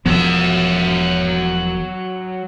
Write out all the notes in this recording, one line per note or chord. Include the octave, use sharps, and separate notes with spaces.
E1 F3 F#3 B3 E5